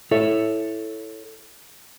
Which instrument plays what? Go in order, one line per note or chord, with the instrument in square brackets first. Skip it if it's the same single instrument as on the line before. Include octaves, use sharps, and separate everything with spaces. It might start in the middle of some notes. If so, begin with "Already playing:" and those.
[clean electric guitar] E4 A4 C#5 E5